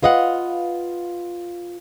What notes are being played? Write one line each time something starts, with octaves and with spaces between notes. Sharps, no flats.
F4 B4 D#5 F5 F#5